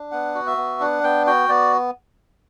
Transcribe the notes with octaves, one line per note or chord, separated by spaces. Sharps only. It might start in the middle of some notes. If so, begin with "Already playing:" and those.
Already playing: D4
B3 F#5
F#4
E5
B3
D4 F#5
B3 G5
F#4 G5
B3 D5